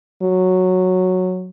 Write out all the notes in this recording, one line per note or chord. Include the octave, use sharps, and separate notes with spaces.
F#3